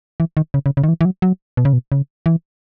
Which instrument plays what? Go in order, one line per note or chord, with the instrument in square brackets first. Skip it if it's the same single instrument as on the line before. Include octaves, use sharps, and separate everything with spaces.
[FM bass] E3
D#3
C#3
C#3
C#3
D#3
E3
E3
F#3
F#3
B2
C#3
B2
C#3
E3